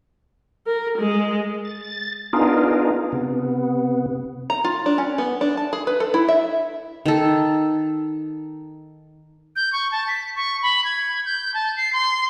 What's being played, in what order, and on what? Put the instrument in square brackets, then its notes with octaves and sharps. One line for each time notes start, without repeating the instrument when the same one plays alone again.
[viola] A#4
G#3
[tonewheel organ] A6
B3 D4 D#4 F4 G#4 A#4
C3 B3
[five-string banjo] A#5
F4
D4
C#4
B3
D4
A5
G#4
B4
A4
E4
E5
[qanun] D#3 A4
[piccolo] G6
C#6
A5
B6
C#6
B5
G#6
G6
A5
C7
C6